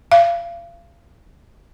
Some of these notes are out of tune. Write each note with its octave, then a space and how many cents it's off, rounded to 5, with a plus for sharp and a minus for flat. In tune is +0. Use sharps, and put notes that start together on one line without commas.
F5 -35